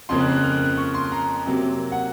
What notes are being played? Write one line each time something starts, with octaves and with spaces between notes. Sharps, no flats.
F2 C#3 F3 A#3 C6
F#6
F#6
F6
F#6
F#6
C#6
C6
A#5
C3 F#3 A#3
F#5